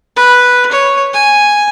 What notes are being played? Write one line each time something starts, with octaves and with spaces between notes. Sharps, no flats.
B4
C#5
G#5